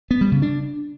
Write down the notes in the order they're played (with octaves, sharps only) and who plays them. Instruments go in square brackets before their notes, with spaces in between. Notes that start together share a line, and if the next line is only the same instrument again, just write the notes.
[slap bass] B3
G3
C#3
D4